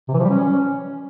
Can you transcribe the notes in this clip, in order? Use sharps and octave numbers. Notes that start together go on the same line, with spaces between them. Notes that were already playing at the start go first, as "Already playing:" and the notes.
C3
E3
F3
G3
C#4